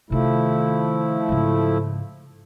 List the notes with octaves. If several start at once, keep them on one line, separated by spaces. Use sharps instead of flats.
C3 D#3 F3 A3 E4
G#2 C#3